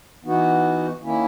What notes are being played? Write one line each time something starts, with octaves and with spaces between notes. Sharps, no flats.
E3 B3 D#4 F#4
D#3 A#3 C#4 E4